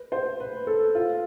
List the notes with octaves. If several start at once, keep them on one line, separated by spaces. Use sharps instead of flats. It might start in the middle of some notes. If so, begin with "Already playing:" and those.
Already playing: B4
C5
B4
A4
F4